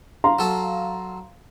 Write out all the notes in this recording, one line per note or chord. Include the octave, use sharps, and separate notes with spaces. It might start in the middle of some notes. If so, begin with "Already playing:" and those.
F5 A#5 C6
F#3 A4